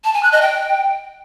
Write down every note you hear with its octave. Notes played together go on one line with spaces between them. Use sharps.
A5
G#5
F#6
D#5
G5